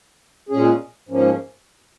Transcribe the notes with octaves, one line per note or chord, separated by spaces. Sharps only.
A#2 G#3 C#4 G#4
G#2 F3 A#3 C#4